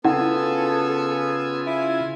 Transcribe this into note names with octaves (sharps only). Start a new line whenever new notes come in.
C#3 B3 E4 F4 A4 F#5 G#5 E6
E4 E5